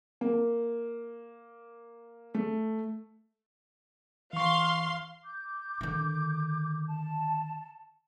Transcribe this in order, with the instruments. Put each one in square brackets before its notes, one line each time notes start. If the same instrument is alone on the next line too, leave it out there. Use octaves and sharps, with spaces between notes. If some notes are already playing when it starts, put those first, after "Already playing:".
[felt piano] A#3
A3
[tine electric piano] E3 C#6 [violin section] F5 C6
[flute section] D6 G6
[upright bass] D3 D#3
[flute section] A5